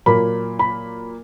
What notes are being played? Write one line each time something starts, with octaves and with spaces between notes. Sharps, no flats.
A#2 F#3 A#3 B5
B5